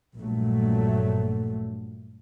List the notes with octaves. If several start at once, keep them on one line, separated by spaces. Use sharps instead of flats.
A#1 G2 A#2 F#3 A3